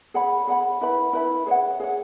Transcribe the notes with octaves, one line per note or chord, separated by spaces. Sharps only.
G#4 C#5 F#5 B5
G#4 C#5 F#5 B5
E4 B4 E5 B5
E4 B4 E5 B5
G#4 C#5 F#5
G#4 C#5 F#5